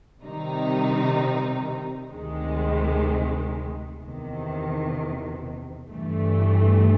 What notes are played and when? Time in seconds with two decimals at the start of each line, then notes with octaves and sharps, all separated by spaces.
0.22 C3 D#3 G3 C4 D#4
2.12 D2 C3 D#3 G#3
4.01 E2 C3 D#3
5.90 G1 G2 E3 A3